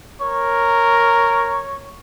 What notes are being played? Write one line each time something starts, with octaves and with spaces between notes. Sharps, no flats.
A#4 C#5